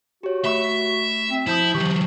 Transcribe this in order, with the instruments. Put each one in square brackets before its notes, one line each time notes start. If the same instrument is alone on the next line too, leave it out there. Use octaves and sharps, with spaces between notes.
[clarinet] F#4 [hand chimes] G4 C#5
[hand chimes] A3 B5 C#6 [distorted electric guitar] E5
[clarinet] C4 [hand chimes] B6
[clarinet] F3 [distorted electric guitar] E4 [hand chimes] D#6 G6 B6
[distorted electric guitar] E3 F#3 [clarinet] G4 [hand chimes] C#6